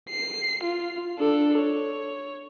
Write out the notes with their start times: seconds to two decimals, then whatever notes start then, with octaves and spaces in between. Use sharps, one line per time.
0.10 C7
0.63 F4
1.19 D4 A4
1.59 C#5